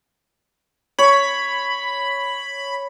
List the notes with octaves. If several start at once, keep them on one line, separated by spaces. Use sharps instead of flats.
C#5 B5